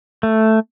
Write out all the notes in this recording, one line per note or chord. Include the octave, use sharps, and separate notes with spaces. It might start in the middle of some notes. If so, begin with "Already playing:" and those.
A3